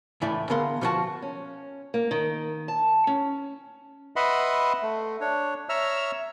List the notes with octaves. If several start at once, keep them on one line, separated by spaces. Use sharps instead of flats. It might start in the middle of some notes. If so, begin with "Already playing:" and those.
C#2 A2 E3 D5 E5
D3 B3 G#4 A#4 F5 C6
B2 F3 D#4 F4 F#4 A5
C#4
A#3
D#3
A5
C#4
B4 D#5 E5 F#5 B5 C6
A3
D4 C#5
C#5 E5 A#5 E6 F6